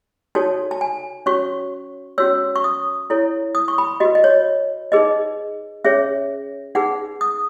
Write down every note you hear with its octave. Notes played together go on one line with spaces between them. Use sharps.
D#4 F#4 A4 C#5 A5
A5
G#5
C#4 F#4 C#5 C#6
C#4 F#4 C#5 E6
C#6
D#6
E4 A4 C#5
D#6
C#6
B5
F#4 B4 D#5
D#5
C#5
D#4 G#4 B4 D#5
C#4 G#4 C#5 E5
D#4 G#4 B4 F#5
D#6